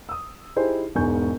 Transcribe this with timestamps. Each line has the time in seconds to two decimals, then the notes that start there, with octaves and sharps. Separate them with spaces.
0.09 D#6 E6
0.56 D#4 E4 G4 G#4 C5
0.95 E1 G#2 B3 G#5 C#6 G6